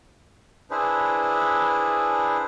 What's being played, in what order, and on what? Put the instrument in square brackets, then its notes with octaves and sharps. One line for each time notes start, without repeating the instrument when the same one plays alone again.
[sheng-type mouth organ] D4 E4 G#4 B4 C5